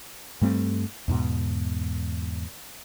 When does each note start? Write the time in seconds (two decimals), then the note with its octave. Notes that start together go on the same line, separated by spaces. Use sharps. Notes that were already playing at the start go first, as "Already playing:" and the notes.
0.41 G2 G3 A3 C4
1.08 E2 G#2 B2